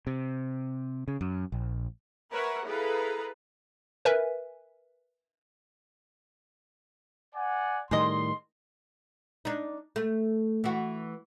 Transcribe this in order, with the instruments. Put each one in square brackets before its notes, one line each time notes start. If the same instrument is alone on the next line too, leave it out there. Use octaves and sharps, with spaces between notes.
[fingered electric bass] C3
C#3
F#2
A#1
[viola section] A#4 B4 C#5 E5 F#5
E4 G#4 A4 B4 F5 A#5
[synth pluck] A#4 B4 E5 G#5
[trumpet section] D5 F#5 G#5
[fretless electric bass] A2 D#3 G3 [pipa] G#4 A#4 D#5 [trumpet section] C6
[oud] D4 D#4
A3
E3 F#4